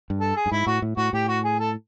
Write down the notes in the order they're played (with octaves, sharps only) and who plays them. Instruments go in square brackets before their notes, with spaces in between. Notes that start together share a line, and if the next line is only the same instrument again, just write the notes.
[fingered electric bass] G2
[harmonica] A4
G#4
[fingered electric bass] G2
[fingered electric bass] G#2 [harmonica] E4
[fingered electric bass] A2 [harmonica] F#4
[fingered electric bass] A2
[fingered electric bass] A2 [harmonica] F#4
[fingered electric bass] A2 [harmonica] G4
[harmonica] F#4
G#4
A4